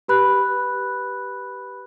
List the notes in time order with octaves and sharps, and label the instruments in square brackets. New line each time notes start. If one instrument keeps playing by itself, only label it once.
[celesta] G4 B4 B5 F#6